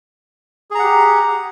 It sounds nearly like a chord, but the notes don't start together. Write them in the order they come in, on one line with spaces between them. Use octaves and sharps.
G#4 A#5 F#5 G4